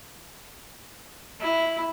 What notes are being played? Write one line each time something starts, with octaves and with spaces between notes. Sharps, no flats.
E4